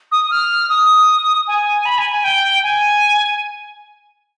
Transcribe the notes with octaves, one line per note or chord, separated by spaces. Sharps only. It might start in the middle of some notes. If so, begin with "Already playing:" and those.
D#6
F6
D#6
G#5
B5
G#5
G#5
G5
G#5